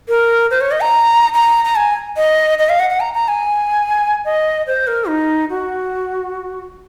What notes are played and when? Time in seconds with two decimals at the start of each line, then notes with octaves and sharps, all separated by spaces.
0.09 A#4
0.51 C5
0.61 C#5
0.71 D#5
0.82 A#5
1.34 A#5
1.65 A#5
1.76 G#5
2.17 D#5
2.59 D#5
2.69 F5
2.80 F#5
2.90 F#5
3.00 A#5
3.14 A#5
3.28 G#5
4.25 D#5
4.67 C5
4.87 A#4
5.08 D#4
5.50 F#4